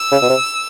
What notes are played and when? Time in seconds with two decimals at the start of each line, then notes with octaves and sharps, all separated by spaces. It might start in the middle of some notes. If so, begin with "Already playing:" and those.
Already playing: E6
0.12 C#3
0.22 B2
0.29 C3